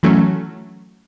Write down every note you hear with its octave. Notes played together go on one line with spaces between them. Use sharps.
E3 F#3 A3 C#4